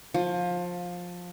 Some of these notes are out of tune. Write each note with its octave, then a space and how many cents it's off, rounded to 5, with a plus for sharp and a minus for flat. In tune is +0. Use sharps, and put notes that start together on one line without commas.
F3 +20